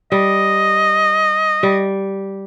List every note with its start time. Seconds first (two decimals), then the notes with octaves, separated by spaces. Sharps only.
0.12 G3 D#5
1.63 G3